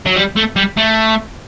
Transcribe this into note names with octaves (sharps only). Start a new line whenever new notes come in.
F#3
G3
A3
G3
A3